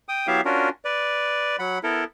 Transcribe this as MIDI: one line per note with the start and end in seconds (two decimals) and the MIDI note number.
0.09 0.27 79
0.09 0.27 87
0.27 0.41 54
0.27 0.41 59
0.27 0.41 64
0.27 0.41 67
0.27 0.41 76
0.27 0.41 77
0.45 0.69 61
0.45 0.69 62
0.45 0.69 65
0.45 0.69 66
0.45 0.69 70
0.85 1.56 71
0.85 1.56 74
1.59 1.78 54
1.59 1.78 78
1.59 1.78 83
1.83 2.04 59
1.83 2.04 64
1.83 2.04 69
1.83 2.04 70